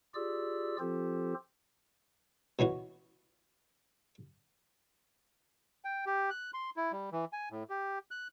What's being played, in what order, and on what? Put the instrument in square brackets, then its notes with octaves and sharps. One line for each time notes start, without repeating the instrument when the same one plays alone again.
[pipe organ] F4 G4 G#4 D5 E6
F3 C4 F4 G4 A4 C5
[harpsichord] B2 E3 C#4 F#4
[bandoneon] G5
G4
F#6
C6
E4
G3
E3
G#5
A2
G4
F#6